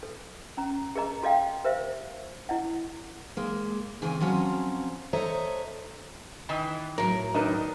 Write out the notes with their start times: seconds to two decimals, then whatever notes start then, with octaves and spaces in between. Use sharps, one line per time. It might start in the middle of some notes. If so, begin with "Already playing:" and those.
0.03 A4
0.57 C#4 A#5
0.96 G#4 A#4 D#5 A#5
1.23 F#4 A4 D#5 F5 G5
1.64 G4 A#4 C5 E5 F5
2.49 E4 D#5 F#5
3.37 G#3 A#3
4.02 C#3 E3 C4 G#5
4.21 F3 F#3 C4 C#4
5.13 A4 C5 C#5 D#5 E5 A#5
6.49 D#3 E3 G#5
6.98 A2 F#3 A#4
7.34 D#3 D4 D#4 A#4 B4